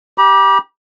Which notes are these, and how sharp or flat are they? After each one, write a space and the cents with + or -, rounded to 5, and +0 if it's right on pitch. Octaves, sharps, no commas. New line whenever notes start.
G4 +0 B5 -45